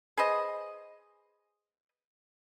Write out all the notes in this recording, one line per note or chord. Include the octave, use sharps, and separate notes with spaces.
G#4 B4 C5 D#5